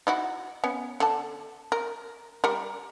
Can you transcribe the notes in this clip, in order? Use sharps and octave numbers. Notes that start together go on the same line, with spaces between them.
D#4 E4 F#4
B3 C#4
D3 A5
A#4
G3 A#4